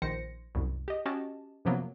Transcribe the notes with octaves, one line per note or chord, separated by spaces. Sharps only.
A#1 D#3 C5 A#6 C#7
C2 F#2
G4 D#5
C#4 F#4 G4 D#5 A5
F#2 C3 F3 F#3 A#3 B3